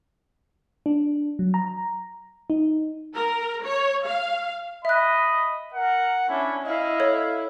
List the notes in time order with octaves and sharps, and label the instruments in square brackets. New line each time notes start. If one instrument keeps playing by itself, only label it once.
[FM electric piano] D4
F#3
A#5
D#4
[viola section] A#4
C#5
F5
[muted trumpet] D#5 [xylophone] E5 F#6 [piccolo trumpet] B5
[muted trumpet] A#4 [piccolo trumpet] F#5
[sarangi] C#4 [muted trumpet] D4 [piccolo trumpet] E4
[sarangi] E4 [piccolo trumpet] D#5 [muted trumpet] F5
[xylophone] A4 C#5